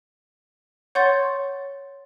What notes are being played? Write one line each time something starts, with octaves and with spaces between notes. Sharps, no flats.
C#5 F#5 C6 C#6 G6 A6